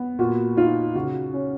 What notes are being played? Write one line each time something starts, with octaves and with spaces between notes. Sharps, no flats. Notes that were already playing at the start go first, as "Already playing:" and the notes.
Already playing: B3
A#2 F#4
D#4 F4
C#3 F#4
C#4